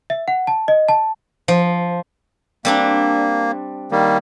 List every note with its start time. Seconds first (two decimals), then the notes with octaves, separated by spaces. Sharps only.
0.10 E5
0.28 F#5
0.47 A5
0.68 D#5
0.89 A5
1.48 F3
2.65 G3 A#3 C4 D4
3.92 D#3 G3 A#3